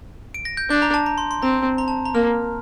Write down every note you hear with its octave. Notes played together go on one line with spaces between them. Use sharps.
D7
A#6
G6
D4 G6
A#5
A5
A#5
C6
C6
C4 A#5
A#5
A5
A#5
A#3 F6